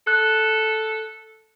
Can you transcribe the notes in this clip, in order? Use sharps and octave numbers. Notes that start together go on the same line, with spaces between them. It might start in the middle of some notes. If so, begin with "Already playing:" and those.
A4 F#6